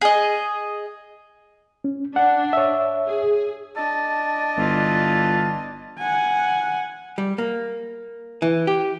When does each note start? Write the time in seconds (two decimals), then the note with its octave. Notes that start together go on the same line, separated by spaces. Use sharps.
0.01 G#4 D#5
1.84 C#4
2.16 D4 F#5
2.53 C#5 E5
3.06 G#4
3.76 D4 D#5 A5
4.57 G1 E3 F4
5.98 F#5 G#5
7.18 G3
7.38 A#3
8.42 E3
8.67 G4